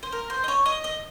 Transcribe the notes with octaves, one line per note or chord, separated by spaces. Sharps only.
C5
A#4
C5
D#5
C#5
D#5
D#5